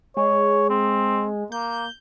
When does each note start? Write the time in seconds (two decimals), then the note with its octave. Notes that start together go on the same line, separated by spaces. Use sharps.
0.17 G#3 C#5
0.69 C4
1.52 A#3 G6